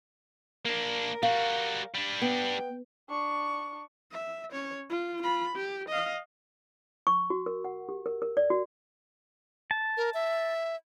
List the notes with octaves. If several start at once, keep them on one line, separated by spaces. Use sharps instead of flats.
A#3 D4 A#4
G3 F#4 F5
G3 D4
B3 G5
D4 C#6
E5
C#4 C#5
F4
F4 B5
G4
D#5 F5
C#6
F#4
A#4
F#5
G4
A#4
A#4
D5
F#4
A5
A#4
E5